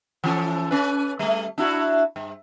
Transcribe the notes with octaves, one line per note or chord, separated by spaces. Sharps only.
E3 C#4 A4
C#4 B4
G3 A3
D4 E4 F#4
G2